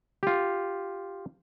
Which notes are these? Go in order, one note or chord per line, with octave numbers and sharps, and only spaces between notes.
F4 G4